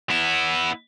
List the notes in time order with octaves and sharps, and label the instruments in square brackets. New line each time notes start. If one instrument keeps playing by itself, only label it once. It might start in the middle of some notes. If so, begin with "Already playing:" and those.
[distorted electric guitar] B3 E4